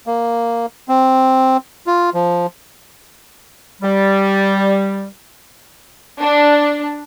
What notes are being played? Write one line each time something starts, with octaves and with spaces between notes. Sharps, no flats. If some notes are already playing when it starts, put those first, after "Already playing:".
A#3
C4
F4
F3
G3
D4